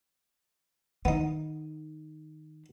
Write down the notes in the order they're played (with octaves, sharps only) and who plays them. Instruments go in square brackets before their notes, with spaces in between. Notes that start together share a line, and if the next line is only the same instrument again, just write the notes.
[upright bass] D#3 [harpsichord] B3 D#4